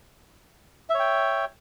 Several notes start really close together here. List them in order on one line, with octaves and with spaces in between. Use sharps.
E5 C#5 G5